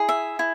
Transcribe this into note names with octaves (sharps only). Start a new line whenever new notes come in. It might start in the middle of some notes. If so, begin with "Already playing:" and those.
Already playing: E4 G#4
E5
E4